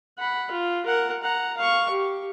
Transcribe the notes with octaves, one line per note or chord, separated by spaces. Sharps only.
F#5 B5
F4
A#4 F#5
F#5 A#5
F5 C#6
G4